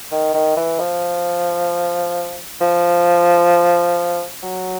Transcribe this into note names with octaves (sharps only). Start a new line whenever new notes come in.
D#3
D#3
E3
F3
F3
F#3